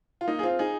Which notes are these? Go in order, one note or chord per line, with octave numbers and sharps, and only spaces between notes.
F4
A#3 D#4
G#4
C4 F4
D#4 G#4